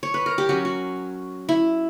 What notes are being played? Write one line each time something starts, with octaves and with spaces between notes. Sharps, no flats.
C#5
B4
A#4
G4
F#3 C#4 F#4
F#4
E4